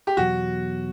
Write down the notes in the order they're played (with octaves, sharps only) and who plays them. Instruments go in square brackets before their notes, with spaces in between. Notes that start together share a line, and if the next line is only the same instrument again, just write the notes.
[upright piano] G4
[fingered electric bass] E2 B2 F#3 [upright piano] F#4